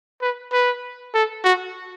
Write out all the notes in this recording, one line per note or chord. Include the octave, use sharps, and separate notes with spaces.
B4
B4
A4
F#4